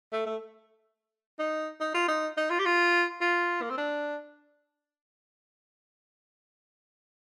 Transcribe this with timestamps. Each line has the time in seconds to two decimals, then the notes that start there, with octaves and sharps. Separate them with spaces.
0.13 A3
0.26 A3
1.39 D#4
1.80 D#4
1.94 F4
2.08 D#4
2.37 D#4
2.51 F4
2.59 G4
2.66 F4
3.21 F4
3.62 A#3
3.70 C4
3.77 D4